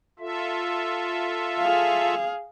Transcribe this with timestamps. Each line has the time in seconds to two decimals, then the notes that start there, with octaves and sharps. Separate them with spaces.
0.19 F4 A4 E5
1.59 G#4 F5